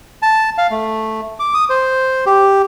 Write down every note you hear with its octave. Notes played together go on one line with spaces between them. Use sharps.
A5
F5
A3
D6
D#6
C5
G4